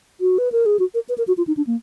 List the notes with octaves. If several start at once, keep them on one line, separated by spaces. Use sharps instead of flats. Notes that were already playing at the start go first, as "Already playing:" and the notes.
F#4
B4
A#4
G#4
F#4
A#4
B4
A#4
F#4
F4
D#4
D4
A#3